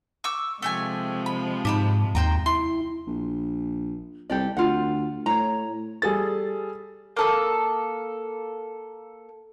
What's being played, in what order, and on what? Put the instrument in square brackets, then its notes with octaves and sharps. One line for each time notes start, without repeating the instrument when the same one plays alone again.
[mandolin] C#6 D6 E6
[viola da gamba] C3 F3 G#3 [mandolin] A3 G4 G#5
[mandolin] B5
[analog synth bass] G#2 [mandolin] G4 A5 B5
[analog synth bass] D#2 [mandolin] C5 G5 A#5
[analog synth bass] E4 [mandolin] C6
[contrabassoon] A#1
[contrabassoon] C2 [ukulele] G4 A4 D5
[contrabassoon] D2 [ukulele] F4 F#5
[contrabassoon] A2 [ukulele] C#5 A#5
[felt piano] G3 G#4 A4 A6
[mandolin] A#3 A4 D#6